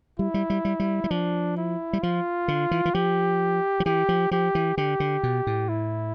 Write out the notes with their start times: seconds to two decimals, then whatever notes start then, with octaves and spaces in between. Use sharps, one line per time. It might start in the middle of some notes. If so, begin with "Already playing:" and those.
0.19 G3 E4
0.34 G3
0.50 G3
0.65 G3
0.80 G3
1.04 G3
1.11 F3 D4
1.57 E4
1.93 G3
2.02 F3 F4
2.48 D3
2.71 E3
2.85 E3
2.94 F3 G4
3.80 F3
3.86 E3 G4
4.09 F3
4.31 F3 G4
4.55 E3
4.77 D3 G4
5.00 D3
5.23 B2
5.47 A2
5.69 E4